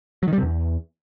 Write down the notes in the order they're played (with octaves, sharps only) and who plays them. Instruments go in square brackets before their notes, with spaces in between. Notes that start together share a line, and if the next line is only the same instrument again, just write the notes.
[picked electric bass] F#3
D#3
G3
C3
E2